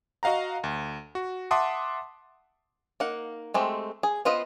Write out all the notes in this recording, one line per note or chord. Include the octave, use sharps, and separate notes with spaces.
F#4 D#5 F5 F#5 A#5
D2
F#4
E5 F#5 A5 C6 D6 D#6
A#3 D#4 F#5
G#3 A3 C4 G4
G#4
B3 F4 B4 C5 D#5